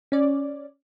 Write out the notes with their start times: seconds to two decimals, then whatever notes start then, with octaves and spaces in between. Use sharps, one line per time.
0.12 C#4 D5